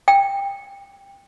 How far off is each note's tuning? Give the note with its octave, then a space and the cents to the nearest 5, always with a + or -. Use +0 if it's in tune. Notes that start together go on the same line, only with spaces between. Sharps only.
G5 +20